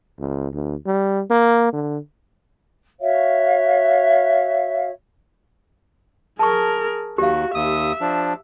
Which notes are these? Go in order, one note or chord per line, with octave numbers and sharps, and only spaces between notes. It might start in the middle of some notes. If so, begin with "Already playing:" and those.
C#2
D2
G3
A#3
D3
F#4 C#5 E5 F5
G#4 A#4 A5 C#6
D#2 F#4 G4 F5
D#2 E5 D#6
F3 D4